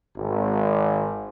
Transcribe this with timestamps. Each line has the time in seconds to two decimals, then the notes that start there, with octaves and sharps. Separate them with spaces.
0.17 G#1